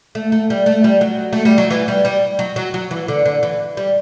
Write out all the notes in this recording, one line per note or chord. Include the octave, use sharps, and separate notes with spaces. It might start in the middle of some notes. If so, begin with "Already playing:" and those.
A3
A3
G3
A3
G3
F#3
A3
G3
F#3
E3
G3
G3
F#3
F#3
F#3
E3
D3
D3
E3
G3